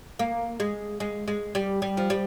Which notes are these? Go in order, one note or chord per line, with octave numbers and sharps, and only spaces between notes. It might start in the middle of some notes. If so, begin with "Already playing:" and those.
A#3
G#3
G#3
G#3
G3
G3
F3
G3